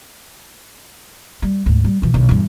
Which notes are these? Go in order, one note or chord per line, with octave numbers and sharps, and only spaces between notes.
G3
D2 G#2
G3
B2 E3
B1 D3
E2 G2